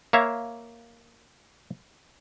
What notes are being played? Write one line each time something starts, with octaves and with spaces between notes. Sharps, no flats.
A#3 C#5 E5 F5